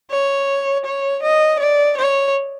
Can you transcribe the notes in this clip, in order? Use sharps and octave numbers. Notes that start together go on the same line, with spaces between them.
C#5
C#5
D#5
D5
C#5